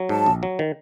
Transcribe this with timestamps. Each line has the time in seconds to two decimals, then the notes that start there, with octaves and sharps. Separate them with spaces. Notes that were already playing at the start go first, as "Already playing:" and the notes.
Already playing: F#3
0.09 G#2 A5
0.26 A#1
0.43 F#3
0.59 D#3